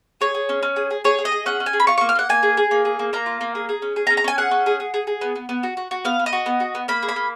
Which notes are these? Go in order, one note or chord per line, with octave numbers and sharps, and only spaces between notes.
G#4 C#5
G#4
C#4
C#4
G#4
G#4
G#4 C#5
G#4
D#5
G#4
C#4 F#5
C#4
G#5
G#4
B5
F4 C#6
A#3 C#6
F6
A#3 F#5
A#3 G#5
G#4
G#4
A#3
G#4
A#3
A#3 A#5
F4
A#3
G#4
G#4
C#4
G#4
A#5
C#4
A#5
C#4 G#5
G#4 F#5
C#4
G#4
G#4
G#4
G#4
B3
B3
B3
F#4
F#4
F#4
B3 F5
B3
D#5
F#4
B3
F#4
B3
A#3 B5
G#4
B5
A#3